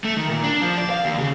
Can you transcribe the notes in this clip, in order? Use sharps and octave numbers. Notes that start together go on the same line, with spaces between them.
A3
D#3
A#2
D4
F3
D5
F5
D#2
C#3